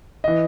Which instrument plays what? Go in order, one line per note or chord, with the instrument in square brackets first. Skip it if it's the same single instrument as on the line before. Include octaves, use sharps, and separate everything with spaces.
[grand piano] E3 D#5